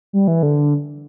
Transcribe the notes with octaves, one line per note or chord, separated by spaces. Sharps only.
G3
E3
D3